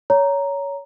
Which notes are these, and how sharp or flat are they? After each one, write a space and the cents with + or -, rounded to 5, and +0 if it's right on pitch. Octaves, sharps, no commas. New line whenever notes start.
C#5 +20 A#5 +0